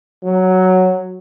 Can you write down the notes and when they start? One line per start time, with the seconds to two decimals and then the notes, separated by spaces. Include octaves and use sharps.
0.24 F#3